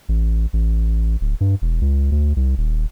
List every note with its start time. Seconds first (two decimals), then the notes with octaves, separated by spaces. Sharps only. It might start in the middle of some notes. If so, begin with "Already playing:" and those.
0.09 A1
0.53 A1
1.21 D1
1.41 G2
1.62 E1
1.81 C#2
2.12 D2
2.36 C2
2.58 D#1